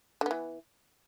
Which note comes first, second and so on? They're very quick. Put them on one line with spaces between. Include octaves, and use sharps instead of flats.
D3 B3 E3